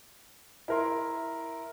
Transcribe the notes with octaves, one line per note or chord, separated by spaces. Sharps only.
E4 A#4 C6